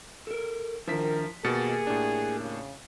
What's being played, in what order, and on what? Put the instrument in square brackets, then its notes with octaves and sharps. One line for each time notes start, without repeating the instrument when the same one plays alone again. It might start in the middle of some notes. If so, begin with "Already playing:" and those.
[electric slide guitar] A4 A#4
[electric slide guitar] D#3 D4 E4 [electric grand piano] F3 B6 [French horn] A#4
[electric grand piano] B2 A6 C#7 [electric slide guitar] A#3 G4 A#4 [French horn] G#4
[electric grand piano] A2 D4
[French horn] C#3